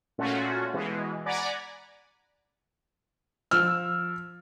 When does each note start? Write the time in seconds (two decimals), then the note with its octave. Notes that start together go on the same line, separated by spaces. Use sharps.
0.18 A#2 A3 C#4 F4 F#4
0.73 B2 E3 G#3
1.26 D5 F#5 G#5 A#5 B5 D6
3.51 F3 E6 F6